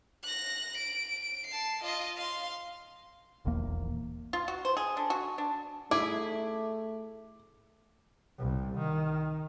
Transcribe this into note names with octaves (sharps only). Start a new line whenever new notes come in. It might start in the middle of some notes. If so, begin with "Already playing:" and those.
F#6 A#6
D7
A5 C7
F4 D#5
F5 C6
D#1 A#1 E2 A#3
F4
F#4
C5
G#4
D3
F#4
D4
A3 E4 G#4 D6
C2
D#3